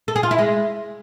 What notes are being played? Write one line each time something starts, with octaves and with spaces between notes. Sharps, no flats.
A4
G#4
F4
E4
G#3